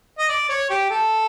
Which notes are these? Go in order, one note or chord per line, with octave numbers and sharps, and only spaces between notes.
D#5
D5
C#5
G4
A4